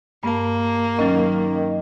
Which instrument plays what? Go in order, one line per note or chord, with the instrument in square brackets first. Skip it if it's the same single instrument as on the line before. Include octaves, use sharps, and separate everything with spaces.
[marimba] G2 A5 [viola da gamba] A#3
[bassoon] D#3 [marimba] F#3 C#4